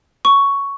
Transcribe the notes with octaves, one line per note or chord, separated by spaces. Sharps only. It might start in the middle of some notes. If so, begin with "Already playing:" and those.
C#6